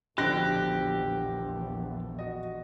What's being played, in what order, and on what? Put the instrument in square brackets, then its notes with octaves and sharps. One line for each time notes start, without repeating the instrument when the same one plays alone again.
[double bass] A#1 E2 [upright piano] B2 D3 F3 [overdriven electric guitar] G4 [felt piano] F#6 A#6
[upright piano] F#4 D#5